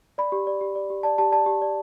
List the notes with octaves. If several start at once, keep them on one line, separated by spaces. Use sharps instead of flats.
D5 B5
G4
D5
G4
D5
G4
D5 A5
G4 A5
D5 A5
G4
D5